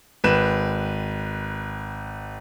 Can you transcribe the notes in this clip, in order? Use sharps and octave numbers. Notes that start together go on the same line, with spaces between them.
G#1 B4 E7